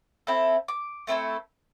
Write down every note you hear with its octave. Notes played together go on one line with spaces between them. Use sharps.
C4 E4 A4
D6
A3 C4 E4 A4